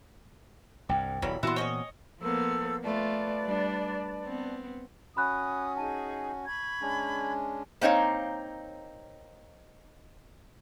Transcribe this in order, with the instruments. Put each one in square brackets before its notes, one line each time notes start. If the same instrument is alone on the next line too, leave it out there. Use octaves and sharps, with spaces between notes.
[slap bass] C2 G2 [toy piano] F#5 G5 D6
[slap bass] D#1 B1 [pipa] E3 F#3 G3 [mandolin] B5 [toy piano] C#6
[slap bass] A#2 E3 B3 [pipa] E4 C6 [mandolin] F#4 A5 A#5
[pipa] C4 C#4 F#4 [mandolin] C#5 D#5
[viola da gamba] F3 A#3 B3 [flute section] A4 C5 E6
[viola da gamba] A3 F4 [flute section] B4 D5 A5
[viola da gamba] G3 D4
B3 C4
[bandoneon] C#4 F#4 [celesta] B5 F#6 [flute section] D#6
[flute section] D#4 G#4 G#5 [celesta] A5
[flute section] B5 C#6 G#6
[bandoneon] G#3 C#4 D4
[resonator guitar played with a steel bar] A#3 C4 D#4 C#5 F5